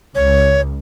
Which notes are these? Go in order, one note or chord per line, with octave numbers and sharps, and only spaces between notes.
C#2 C#5